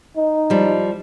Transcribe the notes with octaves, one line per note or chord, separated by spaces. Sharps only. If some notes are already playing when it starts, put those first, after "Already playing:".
D#4
F3 G3